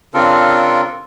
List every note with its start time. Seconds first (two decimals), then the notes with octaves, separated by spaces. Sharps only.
0.14 C#3 C4 D4 F4 A4 A#4